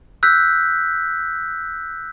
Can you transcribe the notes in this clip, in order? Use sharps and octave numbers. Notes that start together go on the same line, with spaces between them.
E6 F#6 G6 B6